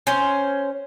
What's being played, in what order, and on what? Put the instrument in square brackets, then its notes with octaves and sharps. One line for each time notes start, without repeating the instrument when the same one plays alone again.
[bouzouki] C#4 C5